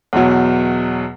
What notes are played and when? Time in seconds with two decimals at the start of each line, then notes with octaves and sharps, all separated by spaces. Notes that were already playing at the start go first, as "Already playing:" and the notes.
0.13 E2 B2 F#3